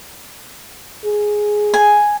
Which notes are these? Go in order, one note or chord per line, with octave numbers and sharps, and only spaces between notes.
G#4
G#5